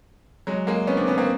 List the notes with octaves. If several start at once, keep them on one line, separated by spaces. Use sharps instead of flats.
F#3 G#3
G#3 A#3
B3 C#4
C4 D4
B3 C#4
A#3 C4